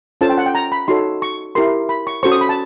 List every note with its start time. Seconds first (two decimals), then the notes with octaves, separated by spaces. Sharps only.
0.21 C#4 F4 A4 C5 A5
0.30 G5
0.38 F#5
0.46 G5
0.55 A#5
0.72 B5
0.88 D#4 F#4 A4 C#5 C6
1.22 C#6
1.55 E4 G4 A#4 C6
1.89 B5
2.07 C#6
2.23 C#4 F#4 A4 C5 C#6
2.31 D#6
2.41 B5
2.49 A5